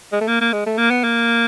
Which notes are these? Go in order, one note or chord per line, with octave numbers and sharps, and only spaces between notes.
G#3
A3
A#3
A#3
G#3
A3
A#3
B3
A#3